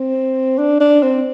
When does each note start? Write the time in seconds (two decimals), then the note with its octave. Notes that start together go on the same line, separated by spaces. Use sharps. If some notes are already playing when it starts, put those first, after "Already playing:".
Already playing: C4
0.58 D4
0.81 D4
1.03 C4